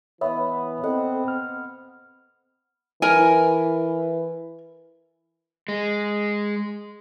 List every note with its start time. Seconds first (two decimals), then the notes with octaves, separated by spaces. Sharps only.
0.21 E3 B3 C#5 D#5 E5 B5
0.84 C4 A4 D#5 F#5
1.28 F6
3.02 E3 A#4 G#5
5.68 G#3